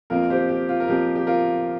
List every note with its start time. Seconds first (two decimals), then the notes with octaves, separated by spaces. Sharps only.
0.10 F2 F3 A#3 F4 A#4
0.30 G4 C5
0.49 G4
0.69 F4
0.80 A#4
0.88 F2 F3 A#3 G4
1.16 G4
1.27 F4 A#4